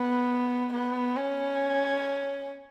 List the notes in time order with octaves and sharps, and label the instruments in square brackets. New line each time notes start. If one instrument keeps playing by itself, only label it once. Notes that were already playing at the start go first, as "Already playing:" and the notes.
Already playing: [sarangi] B3
B3
C#4